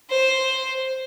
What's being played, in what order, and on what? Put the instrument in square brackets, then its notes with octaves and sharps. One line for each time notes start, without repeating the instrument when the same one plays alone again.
[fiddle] C5